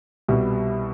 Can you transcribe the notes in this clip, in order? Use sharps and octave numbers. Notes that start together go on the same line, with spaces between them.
C2 B2 G3